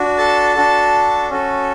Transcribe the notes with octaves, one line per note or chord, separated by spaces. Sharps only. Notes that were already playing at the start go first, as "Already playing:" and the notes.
Already playing: D4 F#4
A4 A5
D4 F#4 A4
C#4 F#4 A4